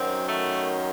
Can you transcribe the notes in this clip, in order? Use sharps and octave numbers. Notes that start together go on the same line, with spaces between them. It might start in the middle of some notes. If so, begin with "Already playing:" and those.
Already playing: F#2 D#3 F#3 C4
A3